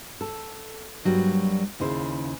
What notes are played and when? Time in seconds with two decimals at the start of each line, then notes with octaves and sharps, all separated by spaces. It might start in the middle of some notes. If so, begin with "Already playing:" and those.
0.21 A4
1.05 G2 F#3 G3 A#3
1.80 D#2 C#3 E4 C5